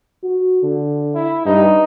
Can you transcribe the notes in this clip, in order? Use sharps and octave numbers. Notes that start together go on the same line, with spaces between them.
F#4
D3
E4
G2 D#4